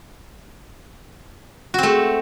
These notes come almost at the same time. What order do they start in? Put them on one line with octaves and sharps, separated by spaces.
F#4 C4 A3